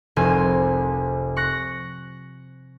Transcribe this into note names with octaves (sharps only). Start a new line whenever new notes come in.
F1 C2 C4 G#5 D#7
C#6 F#6 A#6